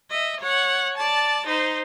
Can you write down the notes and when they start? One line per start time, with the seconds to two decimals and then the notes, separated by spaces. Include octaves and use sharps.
0.10 D#5 E5
0.41 C#5 F#5
0.98 D5 A5
1.47 D#4 C5